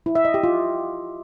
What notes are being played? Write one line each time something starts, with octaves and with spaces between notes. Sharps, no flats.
E4
E5
D#5
G4
F4